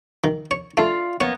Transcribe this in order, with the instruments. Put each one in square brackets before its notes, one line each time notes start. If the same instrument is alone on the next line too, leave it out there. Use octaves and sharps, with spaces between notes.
[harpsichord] D#3
C#5
[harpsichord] A3 [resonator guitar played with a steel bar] F4 D5 F5
[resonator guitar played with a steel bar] F#2 A#3 B3 [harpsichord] C#5